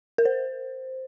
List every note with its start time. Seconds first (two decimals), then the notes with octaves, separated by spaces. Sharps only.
0.18 A#4
0.25 C5